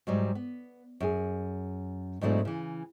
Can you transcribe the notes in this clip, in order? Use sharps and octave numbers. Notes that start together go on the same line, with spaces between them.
G#2 F#3 G3
B3
F#2 G#4
G#2 B2 E3 F#3 A3 D4
C#3 E3